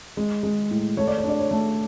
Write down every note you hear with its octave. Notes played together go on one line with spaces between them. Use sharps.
G#3
G#3
A2
A3 C#5
D5
C#5
D4 D5
C#5
A3